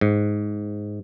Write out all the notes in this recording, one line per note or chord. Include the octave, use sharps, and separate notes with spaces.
G#2